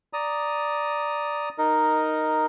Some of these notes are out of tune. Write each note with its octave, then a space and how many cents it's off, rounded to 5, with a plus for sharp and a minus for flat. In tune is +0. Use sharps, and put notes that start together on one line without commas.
D5 +0 A#5 +0 D#6 +0
D#4 +0 A#4 +0 D#5 +0